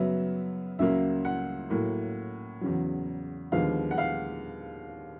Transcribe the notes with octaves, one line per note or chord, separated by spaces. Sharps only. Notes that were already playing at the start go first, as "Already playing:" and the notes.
Already playing: F#2 C#3 F#3 B3 E5
C#2 C#3 F#3 A#3 E5
F#5
A2 F#3 A#3
E2 C#3 F#3
D#2 D3 F3 G#3 B3 F5
F#5
F5